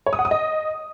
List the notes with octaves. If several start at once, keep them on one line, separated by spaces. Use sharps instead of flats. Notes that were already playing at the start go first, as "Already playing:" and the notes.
C#5
D#6
F#5
D#6
D#5